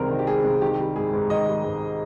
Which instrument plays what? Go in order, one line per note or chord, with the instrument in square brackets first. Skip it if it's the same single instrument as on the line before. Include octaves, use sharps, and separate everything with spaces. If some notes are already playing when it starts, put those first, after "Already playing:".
Already playing: [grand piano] C2 C3 D#3 G#3 [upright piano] A#4 C5
[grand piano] D#3
[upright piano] G4
[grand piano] G#3 [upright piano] G#4
[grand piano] C2
[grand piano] D#3 [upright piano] G4
[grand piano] G3
[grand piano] G#2 [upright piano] G#4
[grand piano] G#2
[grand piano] D#3 [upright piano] D#5
[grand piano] G3
G#2